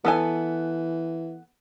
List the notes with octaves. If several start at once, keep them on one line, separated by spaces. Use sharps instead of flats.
E3 B3 A4 G#5